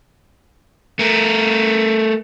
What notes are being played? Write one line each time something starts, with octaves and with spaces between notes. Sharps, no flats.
A3 A#4